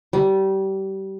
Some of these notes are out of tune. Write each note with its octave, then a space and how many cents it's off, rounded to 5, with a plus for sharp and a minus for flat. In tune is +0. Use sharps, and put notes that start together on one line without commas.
G3 -25